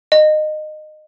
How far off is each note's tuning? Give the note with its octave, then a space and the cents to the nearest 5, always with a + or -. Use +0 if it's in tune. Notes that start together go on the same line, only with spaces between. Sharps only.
D#5 -20